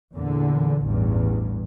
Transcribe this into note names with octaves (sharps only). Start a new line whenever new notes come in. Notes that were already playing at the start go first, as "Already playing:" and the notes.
E2 A#2 D3
A1 E2 G2